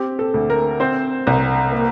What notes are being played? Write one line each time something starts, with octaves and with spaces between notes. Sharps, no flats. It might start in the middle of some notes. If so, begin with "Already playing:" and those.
Already playing: C4 G4
A4
D2
A#4
C4 C5
C2
A#3